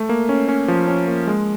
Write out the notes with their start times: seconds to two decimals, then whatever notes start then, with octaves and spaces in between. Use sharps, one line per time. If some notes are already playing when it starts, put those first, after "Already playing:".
Already playing: A3
0.09 A#3
0.29 C#4
0.49 C#4
0.68 F3
0.88 C#4
1.07 A#3
1.27 G#3